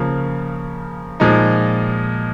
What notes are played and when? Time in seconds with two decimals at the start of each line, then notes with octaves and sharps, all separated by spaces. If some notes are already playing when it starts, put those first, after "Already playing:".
Already playing: C#3 F3 A#3
1.20 A#2 F3 G#3 D#4